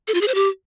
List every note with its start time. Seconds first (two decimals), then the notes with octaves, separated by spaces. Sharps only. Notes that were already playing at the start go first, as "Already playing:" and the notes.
0.08 A4
0.14 F4
0.21 G#4
0.28 C5
0.35 G4